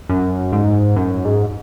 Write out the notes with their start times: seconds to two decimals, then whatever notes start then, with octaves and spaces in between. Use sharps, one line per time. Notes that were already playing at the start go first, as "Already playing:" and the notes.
0.09 F#2
0.52 G#2
0.96 F#2
1.25 G#2